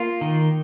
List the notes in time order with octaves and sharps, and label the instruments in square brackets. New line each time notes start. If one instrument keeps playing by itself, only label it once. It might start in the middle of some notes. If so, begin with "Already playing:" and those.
Already playing: [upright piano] A#3 [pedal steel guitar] F4
[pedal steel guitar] D#3